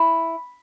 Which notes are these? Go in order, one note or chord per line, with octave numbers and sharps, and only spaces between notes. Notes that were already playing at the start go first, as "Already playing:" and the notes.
Already playing: E4